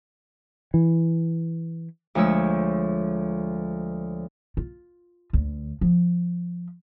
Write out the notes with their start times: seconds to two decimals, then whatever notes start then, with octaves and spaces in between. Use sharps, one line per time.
0.74 E3
2.15 D2 F3 G#3 C#5 E6
4.57 F4
5.33 D2
5.81 F3